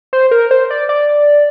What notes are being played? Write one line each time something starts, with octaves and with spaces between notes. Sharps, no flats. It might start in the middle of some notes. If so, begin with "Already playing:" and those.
C5
A#4
C5
D5
D5